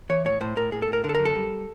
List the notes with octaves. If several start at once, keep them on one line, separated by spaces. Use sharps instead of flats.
E3 C#5
A2 C#5
A2 C5
A2 A#4
A2 G#4
A4
A2
A#4
D3 A#4
A4
F#2 A#4
A4
G3